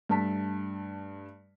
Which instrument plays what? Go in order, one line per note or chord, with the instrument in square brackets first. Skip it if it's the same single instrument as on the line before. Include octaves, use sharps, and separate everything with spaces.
[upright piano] G2 A3 A5 B6